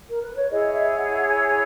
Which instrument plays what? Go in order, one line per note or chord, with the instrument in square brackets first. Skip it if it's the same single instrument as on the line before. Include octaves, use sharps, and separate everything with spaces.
[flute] A#4
B4
C#5
[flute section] E4 G#4 C#5 [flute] D#5
[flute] E5
F#5
G#5
G#5